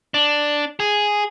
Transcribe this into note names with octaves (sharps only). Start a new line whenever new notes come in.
D4
G#4